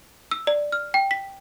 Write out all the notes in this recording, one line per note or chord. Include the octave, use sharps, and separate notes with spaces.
E6
D5
F6
G5
B6